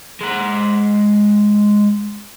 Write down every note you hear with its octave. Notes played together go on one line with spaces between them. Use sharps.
G#3 F#5